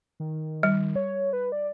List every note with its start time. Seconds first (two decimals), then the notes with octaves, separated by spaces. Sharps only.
0.20 D#3
0.63 G3
0.96 C#5
1.33 B4
1.52 D5